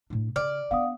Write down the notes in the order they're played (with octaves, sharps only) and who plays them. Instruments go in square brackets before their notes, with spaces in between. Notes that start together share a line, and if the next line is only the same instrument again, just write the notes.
[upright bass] A2 D4
[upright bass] C#3 [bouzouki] D5 [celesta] F6
[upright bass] B3 D4 [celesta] F5 F#5 D#6